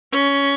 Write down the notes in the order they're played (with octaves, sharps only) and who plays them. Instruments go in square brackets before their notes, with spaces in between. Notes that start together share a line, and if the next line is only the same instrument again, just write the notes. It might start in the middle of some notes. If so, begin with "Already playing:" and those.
[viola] C#4